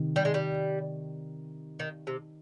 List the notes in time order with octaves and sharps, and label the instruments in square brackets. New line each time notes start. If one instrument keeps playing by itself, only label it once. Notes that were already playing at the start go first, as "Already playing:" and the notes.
Already playing: [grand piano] C3 D#3
[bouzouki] G3
G#3
G3
D#3
C3